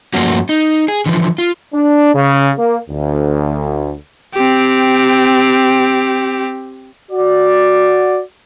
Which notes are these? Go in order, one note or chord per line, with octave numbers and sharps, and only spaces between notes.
G2 F3 A3 A#3 C#4 F#4
D#4
G#4
D3 E3 F3
F4
D4
C#3
A#3
D2
C4 G4
F#4 D5